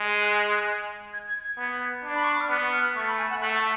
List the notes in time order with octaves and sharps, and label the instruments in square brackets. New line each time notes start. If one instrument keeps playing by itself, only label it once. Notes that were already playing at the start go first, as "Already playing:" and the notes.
Already playing: [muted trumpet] G#3
[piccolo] F#6
G#6
G#6
G#6
[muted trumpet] B3
D4
[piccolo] B5
C#6
D6
F6
[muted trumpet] B3 [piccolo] F#6
[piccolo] F6
[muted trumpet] A3 [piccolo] C#6
[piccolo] B5
G#5
F#5
[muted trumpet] A3 [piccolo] F#5
[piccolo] A5